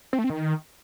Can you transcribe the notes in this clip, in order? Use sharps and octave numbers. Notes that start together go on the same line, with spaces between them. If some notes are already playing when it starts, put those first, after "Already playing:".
C4
A3
C4
D#3